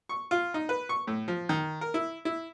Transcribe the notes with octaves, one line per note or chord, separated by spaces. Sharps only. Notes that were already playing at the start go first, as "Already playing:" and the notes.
C#6
F4
D#4
B4
C#6
A2
F3
D#3
A#4
E4
E4